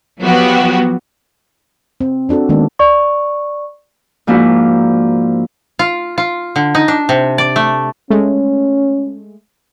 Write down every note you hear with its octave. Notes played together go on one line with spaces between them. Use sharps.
F3 F#3 B3 F#4 G4
C4
C4 D4 F#4 A4
D#3 G#3 A#3 B3 D4
D5 C#6
G#2 F3 A#3 D4 E4 F#4
F4
F4
D3
D#4
D4
C3
D5
A3
G#3 A3 C#4